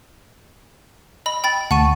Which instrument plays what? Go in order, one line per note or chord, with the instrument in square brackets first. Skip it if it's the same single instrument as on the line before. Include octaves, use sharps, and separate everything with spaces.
[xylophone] D#5 B5 F#7
G5 B5 A6
[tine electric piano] D2 A5 [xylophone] F#5 C#6 D#7